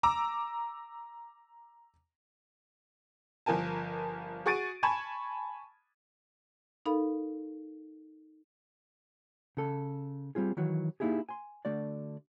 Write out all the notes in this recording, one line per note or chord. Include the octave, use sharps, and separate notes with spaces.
A#5 D6 E6
G1 F3 A#4 G#5 A5
F#4 G#4 C#6 A6 D7 D#7
G#5 A5 B5 C#6 G#6 E7
D#4 A4 A#4 F5 B5
C#3 A4
G3 C4 F4 G#4
D#3 E3 F#3 F#4
A#3 D#4 E4 G4 G#4
G#5 C6
D3 A3 F#4 D5